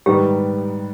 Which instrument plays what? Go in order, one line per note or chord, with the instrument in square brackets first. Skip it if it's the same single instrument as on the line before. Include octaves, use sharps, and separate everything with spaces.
[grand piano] G#2 D#3 G3 B3 [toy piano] G4